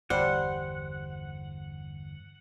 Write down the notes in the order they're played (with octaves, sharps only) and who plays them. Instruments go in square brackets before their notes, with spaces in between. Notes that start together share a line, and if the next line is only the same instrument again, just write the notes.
[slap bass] G1 E2 [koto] G3 [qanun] C5 [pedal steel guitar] F#5